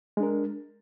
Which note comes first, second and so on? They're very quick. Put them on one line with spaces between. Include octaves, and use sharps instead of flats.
G#3 D4 A#4